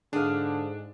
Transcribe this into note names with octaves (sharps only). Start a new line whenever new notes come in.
G#2 D3 D4 G#4 F5